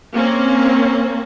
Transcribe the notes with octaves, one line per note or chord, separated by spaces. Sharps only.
A#3 C4 C#4